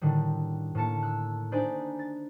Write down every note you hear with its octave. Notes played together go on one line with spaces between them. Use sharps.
A2 D3 D#3 G3
A2 A#3 A5 C#7
E6 F#6
D4 D#4 C5 D5 G#5 B5
A6